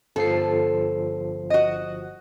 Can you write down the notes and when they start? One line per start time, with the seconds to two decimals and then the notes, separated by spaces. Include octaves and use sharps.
0.16 G1 F3 A4 C7
1.50 F#4 D#5